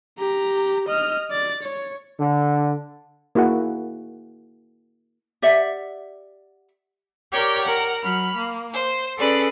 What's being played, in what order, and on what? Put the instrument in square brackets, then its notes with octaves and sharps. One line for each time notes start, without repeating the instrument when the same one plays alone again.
[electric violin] G4 A#5
D#5 F6
D5 A6
C#5
[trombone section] D3
[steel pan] A#3 E4 F#4 G#4 F#5
[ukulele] G4 D5 E5 F#5
[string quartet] G4 A#4 C#5 D5 G5
A#4 F#5
F#3 B5 F6
A#3
C5
C#4 G#4 A4 B4 D5